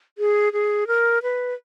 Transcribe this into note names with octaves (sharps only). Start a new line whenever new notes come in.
G#4
G#4
A#4
B4